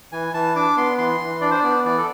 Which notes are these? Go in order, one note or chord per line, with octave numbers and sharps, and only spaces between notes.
E3 G#5
E3 A5
D4 D6
B3 C6
E3 C6
E3
D4 D5
C5
B3 D5
E3 D5
A4